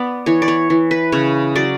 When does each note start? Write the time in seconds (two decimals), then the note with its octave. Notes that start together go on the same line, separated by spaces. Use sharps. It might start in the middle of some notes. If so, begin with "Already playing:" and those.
Already playing: B3 D5
0.26 E3 C#5
0.42 D5
0.48 C#5
0.70 E3
0.91 B4
1.12 C#3 C#5
1.55 F#3 D5